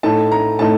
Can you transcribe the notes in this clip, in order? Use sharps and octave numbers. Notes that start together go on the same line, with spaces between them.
A2 A3 D#4 A5
A#5
A2 A3 D#4 A5